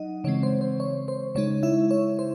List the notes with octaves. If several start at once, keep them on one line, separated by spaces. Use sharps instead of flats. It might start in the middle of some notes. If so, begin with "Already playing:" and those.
Already playing: F#3 D#4 D#5 F#5
C#3 E3 G#3 C4 C#5
C5
C5
C#5
C5
C#3 G#3 D#4 C#5
E4 E5
C#5
C5